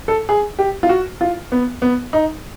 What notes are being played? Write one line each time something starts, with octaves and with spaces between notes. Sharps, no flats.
A4
G#4
G4
F4
F#4
F4
B3
B3
D#4